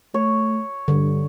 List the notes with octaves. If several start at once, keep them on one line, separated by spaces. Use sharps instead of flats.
A3 C#5
G2 D3